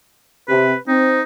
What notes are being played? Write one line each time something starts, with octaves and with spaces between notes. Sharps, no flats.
C3 B4
C4 D#4